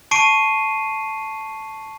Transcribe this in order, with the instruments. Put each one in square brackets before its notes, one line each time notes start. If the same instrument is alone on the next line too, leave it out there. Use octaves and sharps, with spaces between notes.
[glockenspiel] A5 C#6 C7 D7 D#7